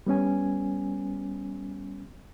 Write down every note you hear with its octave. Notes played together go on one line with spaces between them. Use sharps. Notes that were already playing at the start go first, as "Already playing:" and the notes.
G3 B3 C#4 G#5